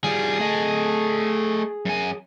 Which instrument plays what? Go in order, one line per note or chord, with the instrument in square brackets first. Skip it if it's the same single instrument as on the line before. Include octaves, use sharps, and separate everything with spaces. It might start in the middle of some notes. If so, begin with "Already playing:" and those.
[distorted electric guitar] G3 F4 [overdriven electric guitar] G#4
[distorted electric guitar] A3 D#5
F#2 G#5